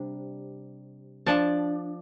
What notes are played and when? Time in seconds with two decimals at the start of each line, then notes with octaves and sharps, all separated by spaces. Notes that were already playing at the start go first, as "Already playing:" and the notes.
Already playing: C3 G3 D4
1.26 F3 D4 A5